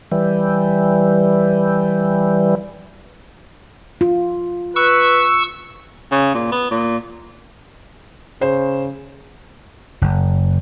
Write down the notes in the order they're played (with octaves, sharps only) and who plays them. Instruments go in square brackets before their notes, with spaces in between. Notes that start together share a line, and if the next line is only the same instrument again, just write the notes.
[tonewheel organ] E3 G3
[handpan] F4
[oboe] B4 [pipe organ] C#6 E6
[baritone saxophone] C#3
A#2
B3
A#2
[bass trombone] C#3 [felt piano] C5
[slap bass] F#1